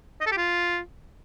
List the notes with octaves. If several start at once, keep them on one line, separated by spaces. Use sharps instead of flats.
D#5
A4
G4
F4